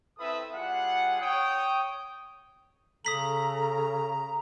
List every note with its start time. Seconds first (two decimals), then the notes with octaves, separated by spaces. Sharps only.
0.18 C4 E4 A4 B4 E5 D#6
0.52 G3 F4 G#4 F#5
1.20 C#5 G5 D#6
3.05 C#3 A4 A#5 D#6 B6 F#7